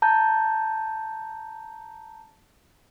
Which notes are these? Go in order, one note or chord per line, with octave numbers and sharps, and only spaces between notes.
A5 A#5 G6